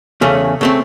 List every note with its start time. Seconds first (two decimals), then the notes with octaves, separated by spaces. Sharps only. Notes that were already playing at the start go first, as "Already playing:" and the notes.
0.21 E2 C#3 A3 C#4
0.61 C#3 A3 C4